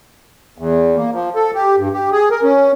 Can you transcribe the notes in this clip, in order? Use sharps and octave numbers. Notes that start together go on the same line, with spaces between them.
E2
A#3
F3
A4
G4
G2
G4
G#4
A#4
C#4